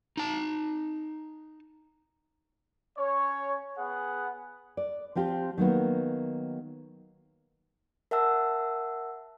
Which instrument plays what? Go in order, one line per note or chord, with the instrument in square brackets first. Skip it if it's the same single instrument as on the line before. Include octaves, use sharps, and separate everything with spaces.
[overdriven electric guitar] D#4 A5
[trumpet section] C#4 C#5
B3 G#4 F#5
[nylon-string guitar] D5
F3 C4 F4 G4
D#3 F#3 A#3 B3
[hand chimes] A#4 E5 F#5 A5 E6